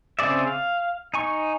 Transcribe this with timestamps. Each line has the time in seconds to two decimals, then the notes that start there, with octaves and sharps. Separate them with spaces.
0.19 C#3 C4 G#4 D5 E5
0.47 F5
1.14 D#4 G#5 C#6